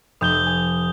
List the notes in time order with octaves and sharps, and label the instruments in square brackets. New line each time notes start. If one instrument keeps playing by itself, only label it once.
[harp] F1 [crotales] D#6 G6 G7
[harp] G#5